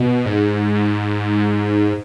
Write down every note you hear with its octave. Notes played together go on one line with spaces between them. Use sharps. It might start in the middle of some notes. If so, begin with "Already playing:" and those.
Already playing: B2
G#2